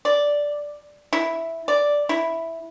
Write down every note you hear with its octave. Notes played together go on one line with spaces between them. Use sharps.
D5
E4
D5
E4